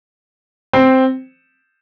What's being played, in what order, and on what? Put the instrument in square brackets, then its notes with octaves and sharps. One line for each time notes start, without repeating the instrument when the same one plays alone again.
[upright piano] C4